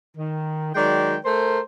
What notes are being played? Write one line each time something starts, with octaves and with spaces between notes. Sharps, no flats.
D#3
D#3 F#3 G#3 D5 G5
A3 A#4 C5